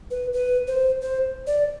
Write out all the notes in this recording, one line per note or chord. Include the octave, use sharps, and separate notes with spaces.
B4
B4
C5
C5
D5